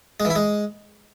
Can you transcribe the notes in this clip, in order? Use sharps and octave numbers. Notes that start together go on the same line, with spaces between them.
G#3
E3
E4
G#3